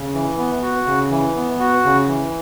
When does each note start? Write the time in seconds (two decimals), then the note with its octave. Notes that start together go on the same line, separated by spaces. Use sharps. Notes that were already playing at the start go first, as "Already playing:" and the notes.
Already playing: C#3
0.14 E3
0.38 B3
0.62 F#4
0.87 C#3
1.11 E3
1.36 B3
1.60 F#4
1.84 C#3
2.08 E3